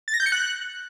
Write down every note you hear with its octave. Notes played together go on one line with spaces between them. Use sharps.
A6
A#6
G6
C#7
F#6